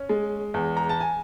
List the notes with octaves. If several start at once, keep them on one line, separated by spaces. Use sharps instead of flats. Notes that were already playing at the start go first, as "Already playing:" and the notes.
Already playing: C#4
G#3
E2
A#5
A5
G#5